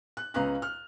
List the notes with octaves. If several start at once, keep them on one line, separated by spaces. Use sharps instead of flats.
F#6
C#2 C#4 B4 F5 A#5 F#6
F6